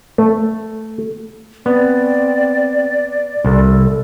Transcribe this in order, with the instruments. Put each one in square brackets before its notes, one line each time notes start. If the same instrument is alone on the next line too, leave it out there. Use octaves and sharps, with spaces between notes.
[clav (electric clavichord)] A3
[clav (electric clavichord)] B3 [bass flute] C4 [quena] D5
[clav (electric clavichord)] C2 [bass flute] A4